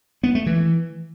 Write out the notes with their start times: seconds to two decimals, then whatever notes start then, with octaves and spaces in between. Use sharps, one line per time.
0.23 B3
0.35 A3
0.46 E3